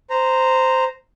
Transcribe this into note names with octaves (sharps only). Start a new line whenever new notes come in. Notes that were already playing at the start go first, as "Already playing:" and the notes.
C5 A#5